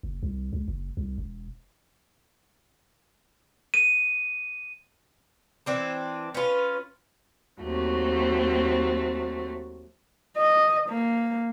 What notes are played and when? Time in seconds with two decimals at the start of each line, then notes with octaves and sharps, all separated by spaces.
0.03 F#1
0.23 C2
0.53 C#2
0.68 F#1
0.97 C2
1.18 E1
3.74 D#7
5.66 E3 C4 D4
6.34 C#4 F4 B4
7.62 D#2 F#3 A3 C4
10.37 D#5
10.89 A#3